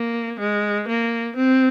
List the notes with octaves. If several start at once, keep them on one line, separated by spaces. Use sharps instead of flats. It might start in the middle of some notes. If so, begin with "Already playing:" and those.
Already playing: A#3
G#3
A#3
C4